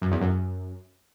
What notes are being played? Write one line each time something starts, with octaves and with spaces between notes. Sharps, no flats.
F#2
E2
F#2